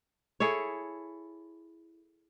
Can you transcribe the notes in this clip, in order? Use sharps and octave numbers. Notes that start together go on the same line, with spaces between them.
E4 G#4 A4 C#5